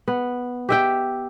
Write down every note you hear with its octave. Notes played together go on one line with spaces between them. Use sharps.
B3
G4 E5 G5